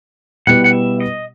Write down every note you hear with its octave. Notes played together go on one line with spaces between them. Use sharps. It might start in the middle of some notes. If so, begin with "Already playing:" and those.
B2 G3 B3 E4 G4 F#5
F#5
E5
D#5